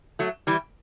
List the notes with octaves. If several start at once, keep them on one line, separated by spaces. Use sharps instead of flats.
F#3 A3
E3 G3